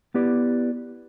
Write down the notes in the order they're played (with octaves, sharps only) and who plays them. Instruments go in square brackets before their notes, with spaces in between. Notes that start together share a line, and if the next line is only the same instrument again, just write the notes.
[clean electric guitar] B3 E4 G4 B4 D5